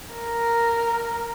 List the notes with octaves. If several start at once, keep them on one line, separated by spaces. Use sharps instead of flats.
A#4